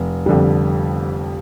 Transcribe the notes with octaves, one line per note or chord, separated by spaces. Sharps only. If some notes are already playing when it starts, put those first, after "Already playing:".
Already playing: F1
F2 D3 G3